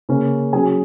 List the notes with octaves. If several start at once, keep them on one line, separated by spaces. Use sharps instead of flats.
C#3 A#3 C#4
F#3 C#4 G#4 G#5